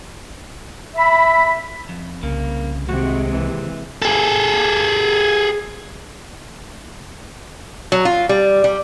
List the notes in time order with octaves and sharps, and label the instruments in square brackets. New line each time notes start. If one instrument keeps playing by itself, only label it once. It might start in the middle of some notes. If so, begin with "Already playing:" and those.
[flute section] E5 B5
[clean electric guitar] F2
[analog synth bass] C2 [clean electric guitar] C#3 [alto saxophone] A#3
[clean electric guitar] D#2 [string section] C3 G#3 [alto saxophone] F#4
[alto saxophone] E3
[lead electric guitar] G#4 A4
[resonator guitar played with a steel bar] F#3
F4
G3
G3